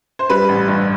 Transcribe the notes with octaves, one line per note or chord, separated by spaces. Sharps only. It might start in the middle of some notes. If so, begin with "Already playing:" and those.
C5
G3 B4
A1
G2